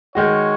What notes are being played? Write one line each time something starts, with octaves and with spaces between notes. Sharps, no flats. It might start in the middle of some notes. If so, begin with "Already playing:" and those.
D#3 G#3 F#4 C#5